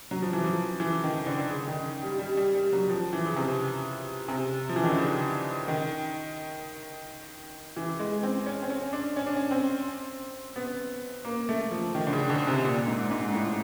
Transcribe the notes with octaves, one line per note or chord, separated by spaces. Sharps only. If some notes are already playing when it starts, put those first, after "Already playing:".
F#3
F3
E3
F3
E3
D#3
D3
C#3
D#3
G3
G3
G3
G3
F#3
F3
E3
C#3
C3
C3
F3
E3
D#3
D3
C#3
D#3
E3
G#3
C4
C#4
C4
C#4
D4
C#4
D4
C#4
C4
B3
A#3
A3
F3
D#3
D3
C#3
D3
C3
A#2
G#2
G#2
A2